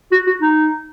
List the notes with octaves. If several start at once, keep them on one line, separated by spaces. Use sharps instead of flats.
F#4
F#4
D#4